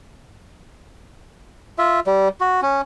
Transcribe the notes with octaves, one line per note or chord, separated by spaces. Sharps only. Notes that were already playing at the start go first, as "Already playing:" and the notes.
F4 E5
G3
F#4
C#4